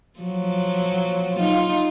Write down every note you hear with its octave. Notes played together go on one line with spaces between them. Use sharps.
F3 F#3
D#4 F4